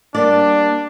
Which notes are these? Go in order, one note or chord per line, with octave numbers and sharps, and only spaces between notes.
G3 A#3 D4 D5